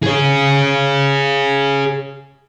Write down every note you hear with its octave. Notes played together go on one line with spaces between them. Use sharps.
G#4 C#5